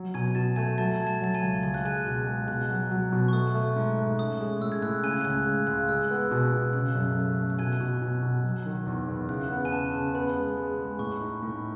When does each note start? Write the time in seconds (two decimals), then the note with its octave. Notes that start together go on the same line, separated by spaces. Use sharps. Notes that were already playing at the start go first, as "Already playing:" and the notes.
Already playing: F#3
0.14 B2 G#5 G#6
0.35 B2 A5 A6
0.56 A3 G#5 G#6
0.78 F#3 A5 A6
0.96 F#3 G#6
1.07 A5 A6
1.21 F#3 A6
1.34 G#5 G#6
1.42 C#2
1.63 C#2 G#6
1.74 F#6
1.85 G#3 G#5 G#6
2.06 B2
2.27 G#3
2.48 B2 F#6
2.70 F#3
2.91 F#3
3.12 B2
3.28 C#6
3.33 A3 D#6
3.55 A3
3.76 G#2
3.97 A3
4.19 C#4 D#6
4.40 G#3
4.61 A2 E6
4.72 G#6
4.82 A2 F#6
5.04 C#3 G#5 G#6
5.21 F#6
5.24 C#2 G#5 G#6
5.46 G#3
5.67 C#2 F#6
5.89 G#3 E6
6.11 B3
6.31 B2
6.52 B2
6.73 C#3 F#6
6.95 F#2
7.16 A3
7.37 A3
7.50 F#6
7.59 B2 G#5 G#6
7.80 B2
8.02 B2
8.23 B2
8.44 F#3
8.66 D#3
8.87 E2
9.08 E2
9.29 C#3 F#6
9.51 B3
9.65 G#5
9.72 C#3 A5
9.93 C#3
10.14 B3 B5
10.36 G#3
10.57 G#3
10.79 G#3
10.99 A2 C#6
11.21 D#4
11.43 A2